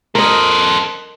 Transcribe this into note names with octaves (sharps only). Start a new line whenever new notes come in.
A4 A#4 C5 D#5